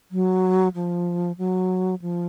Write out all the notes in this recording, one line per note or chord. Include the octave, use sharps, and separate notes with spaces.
F#3
F3
F#3
F3